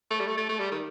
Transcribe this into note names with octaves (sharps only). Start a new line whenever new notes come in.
A3
G3
A3
A3
A3
G3
D#3